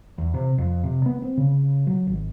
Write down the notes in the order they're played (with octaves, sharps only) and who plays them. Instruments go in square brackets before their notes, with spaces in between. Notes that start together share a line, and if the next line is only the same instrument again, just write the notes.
[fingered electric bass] E2
C3
F2
C3
B3
C4
C#3
F#3
G#1